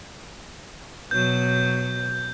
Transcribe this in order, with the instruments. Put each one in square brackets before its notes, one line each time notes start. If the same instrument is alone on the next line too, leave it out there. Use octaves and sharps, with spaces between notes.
[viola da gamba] B2 F#3 [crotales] G6